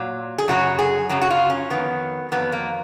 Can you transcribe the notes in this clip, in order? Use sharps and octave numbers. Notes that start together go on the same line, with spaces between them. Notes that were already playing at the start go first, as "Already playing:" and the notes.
Already playing: A#2 F#3
G#4
F#2 C#3 F#3 F#4
G#4
F#2 C#3 F#3 F#4
F#4
F4
C#4
F2 D#3 F#3 B3
F2 D#3 F#3 B3
A#3